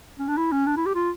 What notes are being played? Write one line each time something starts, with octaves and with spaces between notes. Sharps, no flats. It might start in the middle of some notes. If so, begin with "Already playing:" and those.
C#4
D4
E4
C#4
D4
E4
G4
F4